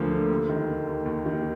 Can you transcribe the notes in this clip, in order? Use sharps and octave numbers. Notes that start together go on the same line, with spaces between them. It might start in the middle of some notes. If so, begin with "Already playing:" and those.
Already playing: D2 D3 F3 A#3
D3
D#2
D#3
A#3
D#2
D#2
D#3